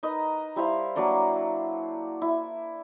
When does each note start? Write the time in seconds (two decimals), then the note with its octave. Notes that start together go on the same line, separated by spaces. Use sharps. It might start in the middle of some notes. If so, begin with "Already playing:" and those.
0.03 D#4 A#4 B4 D#5
0.56 G3 E4 C5 F5
0.96 F#3 A#3 D4 D5
2.22 E4